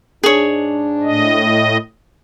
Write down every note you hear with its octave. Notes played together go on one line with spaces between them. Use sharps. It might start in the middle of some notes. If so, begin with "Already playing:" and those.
G#2 D4 G#4 C#5
A2 D#5